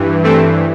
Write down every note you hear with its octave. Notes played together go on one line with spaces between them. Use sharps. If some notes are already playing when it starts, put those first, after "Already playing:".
Already playing: G2 E3
A3 C4